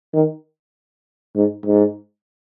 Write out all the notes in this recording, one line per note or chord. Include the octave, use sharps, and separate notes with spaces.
D#3
G#2
G#2